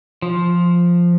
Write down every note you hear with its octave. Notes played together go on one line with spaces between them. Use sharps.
F3